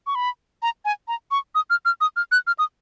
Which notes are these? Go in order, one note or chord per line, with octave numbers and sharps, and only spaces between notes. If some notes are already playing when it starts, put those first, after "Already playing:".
C#6
B5
A#5
G#5
A#5
C#6
D#6
F6
F6
D#6
F6
F#6
F6
D#6